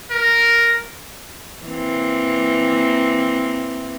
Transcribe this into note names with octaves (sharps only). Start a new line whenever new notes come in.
A#4
E3 A#3 C4